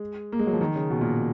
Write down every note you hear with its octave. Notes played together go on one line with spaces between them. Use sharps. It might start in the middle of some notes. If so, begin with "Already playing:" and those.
Already playing: G#3
A#3
G#3
F#3
F3
D#3
C#3
B2
A#2